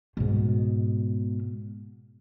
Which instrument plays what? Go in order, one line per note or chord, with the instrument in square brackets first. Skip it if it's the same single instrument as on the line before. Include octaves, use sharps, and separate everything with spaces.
[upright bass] G#2 B2